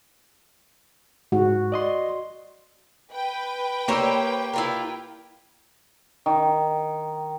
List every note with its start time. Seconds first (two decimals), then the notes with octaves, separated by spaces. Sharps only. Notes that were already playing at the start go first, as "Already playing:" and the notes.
1.32 G#2 F#4
1.72 D5 D#5 C6
3.13 B4 G5
3.88 A#3 G4 A#4 C5 C#5 E6
4.53 E4 F4 A#4
6.26 D#3